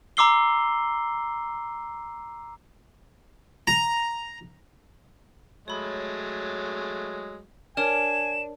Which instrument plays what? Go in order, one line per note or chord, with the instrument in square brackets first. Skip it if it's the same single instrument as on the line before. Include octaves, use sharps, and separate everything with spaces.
[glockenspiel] A#5 C6 D6 E6 C7 G7
[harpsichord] A#5
[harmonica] F#3 G#3 A3 [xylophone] C#5 B5
[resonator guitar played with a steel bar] D4 [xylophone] A#4 C#5 F6 [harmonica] G#5 [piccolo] E7